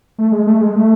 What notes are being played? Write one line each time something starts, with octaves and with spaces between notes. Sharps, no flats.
A3
G#3
A3
G#3
A3